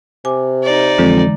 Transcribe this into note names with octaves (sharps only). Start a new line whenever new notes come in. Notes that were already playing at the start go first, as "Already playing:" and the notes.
C3 G#5 D6
D#4 D5
F2 D3 E3 G#3